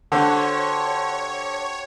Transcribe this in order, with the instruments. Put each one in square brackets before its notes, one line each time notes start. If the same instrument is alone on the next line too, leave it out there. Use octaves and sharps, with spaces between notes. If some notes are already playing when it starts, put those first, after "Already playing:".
[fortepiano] D3 [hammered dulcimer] F#4 G4 C5 [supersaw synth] C#5